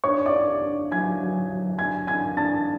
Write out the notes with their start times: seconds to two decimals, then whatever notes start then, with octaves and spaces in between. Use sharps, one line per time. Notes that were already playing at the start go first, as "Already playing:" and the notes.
0.04 D4 C#5 C#6
0.26 D5 D6
0.34 D4
0.62 D4
0.91 F#3 G#5 G#6
1.20 F#3
1.50 F#3
1.78 D4 G#5 G#6
2.07 D4 G#5 G#6
2.36 D4 A5 A6